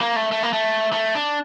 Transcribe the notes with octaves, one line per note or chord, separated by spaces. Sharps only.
A#3
A3
A3
A#3
A3
A3
D4